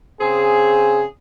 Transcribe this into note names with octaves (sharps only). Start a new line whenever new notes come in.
C#3 C4 G#4